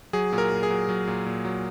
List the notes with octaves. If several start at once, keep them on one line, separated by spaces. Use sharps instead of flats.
F#3 G#4
A#2
A#4
A#2
G#4
F#3
F#3
A#2
A#2
F#3